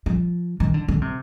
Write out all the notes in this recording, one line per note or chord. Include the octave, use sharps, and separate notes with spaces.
F3
D#3
D3
D3
C3